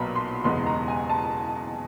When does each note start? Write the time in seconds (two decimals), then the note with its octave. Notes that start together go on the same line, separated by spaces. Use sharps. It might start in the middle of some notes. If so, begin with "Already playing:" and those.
Already playing: B1 A#2 F#3 B3 A#5 B5
0.15 C6
0.44 F#1 E2 B2 G#3 C6
0.66 A#5
0.88 G#5
1.10 A5